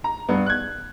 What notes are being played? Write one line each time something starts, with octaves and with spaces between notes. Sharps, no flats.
A#5
G2 B3
F#6 G#6